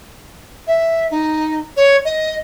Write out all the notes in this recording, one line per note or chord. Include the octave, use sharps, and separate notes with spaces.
E5
D#4
C#5
D#5